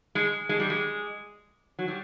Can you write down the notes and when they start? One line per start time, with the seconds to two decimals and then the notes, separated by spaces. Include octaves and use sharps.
0.15 G#3
0.49 G#3
0.60 G3
0.70 G#3
1.79 F#3
1.88 G3